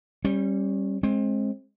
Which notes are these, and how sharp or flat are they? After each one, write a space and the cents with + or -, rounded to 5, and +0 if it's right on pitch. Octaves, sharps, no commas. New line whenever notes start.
G3 +0 C#4 -30
G#3 +15 C4 +30